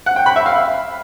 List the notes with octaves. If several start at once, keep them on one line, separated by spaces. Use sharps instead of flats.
F#5
G5
B5
E5
F5